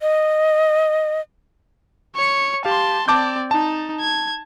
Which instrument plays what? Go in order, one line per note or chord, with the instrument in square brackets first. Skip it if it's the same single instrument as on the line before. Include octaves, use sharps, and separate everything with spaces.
[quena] D#5
[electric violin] C#5 C#7
[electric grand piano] G4 F5 [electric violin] A5 C6
[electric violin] C4 D5 [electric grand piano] A5 D6 G6
[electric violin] D#4 [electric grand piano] A5
[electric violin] G#6